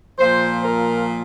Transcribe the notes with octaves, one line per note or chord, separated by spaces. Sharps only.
A#2 F3 C5
A#4